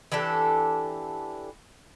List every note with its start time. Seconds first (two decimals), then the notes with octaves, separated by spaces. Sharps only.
0.12 E3 D4 G4 A4